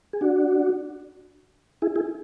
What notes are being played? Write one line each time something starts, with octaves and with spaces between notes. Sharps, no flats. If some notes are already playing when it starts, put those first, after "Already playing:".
G#4
D4 F#4
E4 G#4
E4 G#4